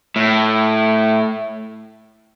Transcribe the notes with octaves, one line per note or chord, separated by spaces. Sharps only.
A2